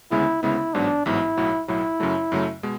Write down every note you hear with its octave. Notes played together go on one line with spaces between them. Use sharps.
D2 C#3 G#3 B3 E4
D2 C#3 G#3 B3 E4
A1 G#2 F#3 B3 D4
A1 G#2 F#3 B3 E4
B1 A2 F#3
B1 A2 F#3 E4
F#2 C#3 F#3 A3
F#2 C#3 F#3 A3
B2 G#3